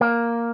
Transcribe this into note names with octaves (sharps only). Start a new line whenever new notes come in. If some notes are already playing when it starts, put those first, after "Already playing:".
A#3